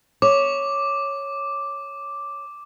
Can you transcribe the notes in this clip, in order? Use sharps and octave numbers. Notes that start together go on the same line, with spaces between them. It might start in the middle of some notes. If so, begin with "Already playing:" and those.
C#5 D6